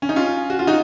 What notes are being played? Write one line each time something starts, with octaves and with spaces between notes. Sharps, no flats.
C#4
D#4
C#4 F4
F#4
F4
D#4 F#4